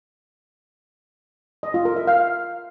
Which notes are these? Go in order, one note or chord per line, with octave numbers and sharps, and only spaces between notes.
D#5
F4
A#4
E5
F5